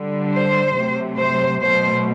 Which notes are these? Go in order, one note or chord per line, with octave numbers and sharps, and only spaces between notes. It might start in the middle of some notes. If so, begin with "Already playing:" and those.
Already playing: D3 G3
C5
C3 F#3 A3
C5
B2 F#3 A3 C5